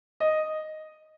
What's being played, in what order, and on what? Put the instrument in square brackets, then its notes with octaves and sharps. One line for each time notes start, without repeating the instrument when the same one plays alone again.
[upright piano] D#5